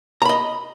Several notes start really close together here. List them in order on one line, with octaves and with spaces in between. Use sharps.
A#5 B5 D#5